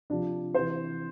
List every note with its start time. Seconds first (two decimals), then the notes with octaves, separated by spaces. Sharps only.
0.10 C3 F3 D4
0.54 C3 E3 C5